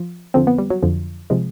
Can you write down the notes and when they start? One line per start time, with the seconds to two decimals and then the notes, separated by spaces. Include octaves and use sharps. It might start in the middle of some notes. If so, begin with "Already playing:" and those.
Already playing: F3
0.34 F2 D3 F3 C4
0.47 B3
0.58 G3
0.70 F#3
0.83 F2 D3 F3
1.30 C3 F3 G#3